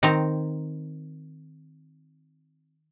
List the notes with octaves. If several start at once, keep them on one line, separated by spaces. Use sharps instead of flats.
D#3 C4 A#5